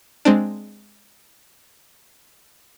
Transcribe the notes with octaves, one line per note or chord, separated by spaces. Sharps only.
G#3 C4 D4